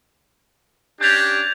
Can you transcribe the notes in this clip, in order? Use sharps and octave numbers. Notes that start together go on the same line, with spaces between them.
C#4 D4 G4 G6 G#6 F7